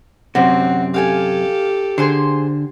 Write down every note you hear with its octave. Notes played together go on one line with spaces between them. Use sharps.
F#2 C3 C4 F#4
G4 A4 F5 G5 G#5
D3 G#4 C5 C6